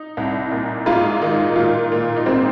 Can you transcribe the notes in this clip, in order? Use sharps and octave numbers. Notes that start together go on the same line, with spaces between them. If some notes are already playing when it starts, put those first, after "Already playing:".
Already playing: D#4
C2
A#2
G#2 F4
D#3 D#4
A#2 F4
A#2
D#4
G#2 C4